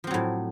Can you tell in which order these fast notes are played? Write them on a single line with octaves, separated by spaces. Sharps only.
F3 C4 F#3 A2